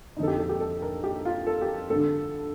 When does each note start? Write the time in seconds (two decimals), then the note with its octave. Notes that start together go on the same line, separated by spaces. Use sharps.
0.17 D3 D#4
0.20 F2 A4
0.28 G4
0.39 A4
0.49 G4
0.60 A4
0.82 A#4
1.04 G4
1.25 F4
1.47 A4
1.62 G4
1.90 G2 D3 A4